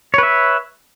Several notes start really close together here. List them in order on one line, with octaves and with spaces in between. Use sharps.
C#5 B4 E5